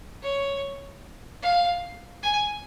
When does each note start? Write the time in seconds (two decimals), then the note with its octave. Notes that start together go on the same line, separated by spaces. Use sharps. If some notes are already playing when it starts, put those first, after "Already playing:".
0.22 C#5
1.43 F5
2.23 G#5